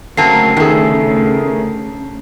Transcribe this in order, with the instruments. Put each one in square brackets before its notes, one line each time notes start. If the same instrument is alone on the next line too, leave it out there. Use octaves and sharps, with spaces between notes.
[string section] D2 C#3 [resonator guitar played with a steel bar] F#3 A#3 C4 [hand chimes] A5 C7
[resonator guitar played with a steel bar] E2 A4 [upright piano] D#3 G#4